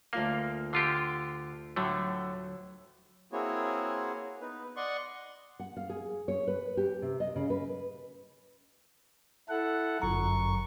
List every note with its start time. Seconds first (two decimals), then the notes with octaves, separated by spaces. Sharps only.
0.13 D2 A#3 F4 F5
0.73 D3 F4 G4 C6
1.76 A2 D3 F#3 A3
3.32 A#3 C4 E4 F#4 G#4 C#5
4.41 B3 D#4 B4
4.76 D5 D#5 F#5 C6 C#6
5.60 F#5
5.77 F5
5.90 G#4
6.28 C#5
6.47 B4
6.77 G4
7.02 C3
7.20 D#5
7.36 C#3
7.50 B4
9.49 E4 A4 F#5
10.02 G1 F#2 A#5 C#6